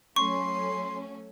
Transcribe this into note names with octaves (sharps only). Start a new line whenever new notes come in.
F#3 A3 C#4 C6 C#6